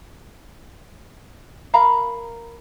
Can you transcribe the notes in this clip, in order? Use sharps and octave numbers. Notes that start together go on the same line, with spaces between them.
A#4 F5 A#5 B5